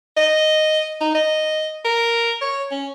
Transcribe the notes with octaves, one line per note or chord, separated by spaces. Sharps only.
D#5
D#4
D#5
A#4
C#5
C#4